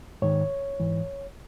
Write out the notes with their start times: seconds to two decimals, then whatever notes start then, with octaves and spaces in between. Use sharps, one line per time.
0.22 G#2 D#3 C#5
0.80 G#2 E3